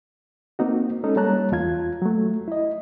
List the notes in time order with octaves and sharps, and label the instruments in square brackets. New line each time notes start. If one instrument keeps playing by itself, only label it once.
[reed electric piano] A#3 C4 D#4 F#4
G#3 C#4 D#4 A4
G3 A#3 C#5 A5 A#5 F#6
E2 F4 G#6
F#3 A3
E4 D#5